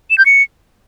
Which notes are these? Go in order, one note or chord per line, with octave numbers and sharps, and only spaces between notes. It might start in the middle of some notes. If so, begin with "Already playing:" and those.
E7
G6
C#7